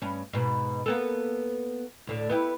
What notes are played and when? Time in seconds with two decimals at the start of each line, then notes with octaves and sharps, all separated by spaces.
0.02 G2 C#4
0.33 G#2 B2
0.86 A#3 B3 A4
2.07 D2 A2 D3
2.30 B3 E4 G4